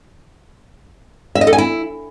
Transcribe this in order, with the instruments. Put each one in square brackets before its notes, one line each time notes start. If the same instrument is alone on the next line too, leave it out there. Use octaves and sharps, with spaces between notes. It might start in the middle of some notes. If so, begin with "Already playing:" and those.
[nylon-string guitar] E5
D#5
A4
G#5
E4